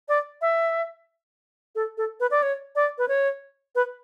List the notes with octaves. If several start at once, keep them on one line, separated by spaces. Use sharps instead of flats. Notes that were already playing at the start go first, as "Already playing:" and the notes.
D5
E5
A4
A4
B4
D5
C#5
D5
B4
C#5
B4